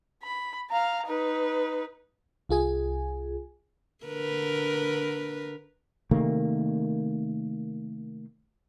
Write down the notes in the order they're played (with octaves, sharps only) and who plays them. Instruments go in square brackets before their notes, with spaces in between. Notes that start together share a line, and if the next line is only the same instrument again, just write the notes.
[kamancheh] B5
F5 A#5
D#4 B4
[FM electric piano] C2 F4 G#4 G#5
[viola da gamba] D3 A#4 B4
[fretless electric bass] C3 D#3 A3 A#3